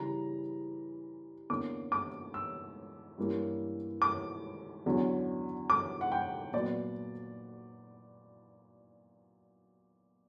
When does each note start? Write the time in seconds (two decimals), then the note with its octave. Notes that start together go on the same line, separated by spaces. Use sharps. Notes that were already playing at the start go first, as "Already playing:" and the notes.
Already playing: C#3 E3 G3 A#5
1.50 E2 D3 A#3 C#4 D6
1.92 D6
2.34 E6
3.18 G2 E3 A#3 C#4
4.02 D6
4.86 E2 D3 F#3 C#4
5.70 D6
6.01 F#5
6.12 G5
6.53 A#2 F#3 B3 D5